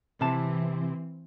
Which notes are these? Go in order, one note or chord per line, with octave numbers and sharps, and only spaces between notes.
C3 E3 C4 A5